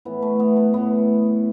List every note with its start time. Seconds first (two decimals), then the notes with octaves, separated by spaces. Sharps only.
0.05 A2 E3 B3
0.22 A3
0.40 B3
0.57 B3
0.74 A2 E3 B3